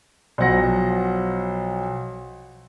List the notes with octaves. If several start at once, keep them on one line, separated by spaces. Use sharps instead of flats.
B1 F3 F#5 A#6